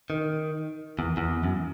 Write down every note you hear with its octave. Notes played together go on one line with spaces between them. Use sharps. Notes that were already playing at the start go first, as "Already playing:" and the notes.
D#3
E2
E2
F#2